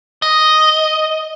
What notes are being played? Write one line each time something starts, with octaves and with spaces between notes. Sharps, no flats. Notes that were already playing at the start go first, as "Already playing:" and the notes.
D#5